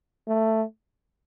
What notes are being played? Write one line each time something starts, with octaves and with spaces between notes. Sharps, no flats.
A3